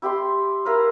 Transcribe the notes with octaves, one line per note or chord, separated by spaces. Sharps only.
E4 G4 G5 C6
E4 A#4 B4 F5